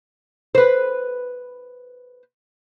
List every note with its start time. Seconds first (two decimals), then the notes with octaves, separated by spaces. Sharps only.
0.55 B4 C5